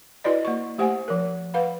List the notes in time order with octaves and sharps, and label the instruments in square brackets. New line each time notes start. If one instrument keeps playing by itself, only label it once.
[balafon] E4 F#4 B4 D5 D#5
A#3 C#6
A3 G4 C5 F#5 G#5
F3 A#4
B4 F5 F#5 B5